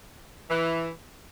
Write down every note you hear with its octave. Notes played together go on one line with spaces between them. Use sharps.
E3